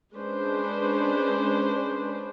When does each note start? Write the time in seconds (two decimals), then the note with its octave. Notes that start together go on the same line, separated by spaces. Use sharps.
0.14 G#3 C#4 D4 B4 C5